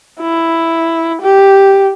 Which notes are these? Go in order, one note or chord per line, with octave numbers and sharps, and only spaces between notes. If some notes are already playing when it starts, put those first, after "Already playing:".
E4
G4